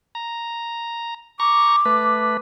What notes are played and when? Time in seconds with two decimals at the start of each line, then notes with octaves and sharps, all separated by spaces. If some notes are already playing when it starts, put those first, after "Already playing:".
0.15 A#5
1.40 A#5 C#6 D6
1.85 A3 B4